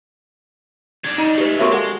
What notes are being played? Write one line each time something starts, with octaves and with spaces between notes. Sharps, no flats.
D#3 D4 G#6
D#4 D#5
G#3 A3 G4 B4
D3 A#3 C4 F#4 A#4 C#5 E5 C#6
G#3 A4 D#5 F#5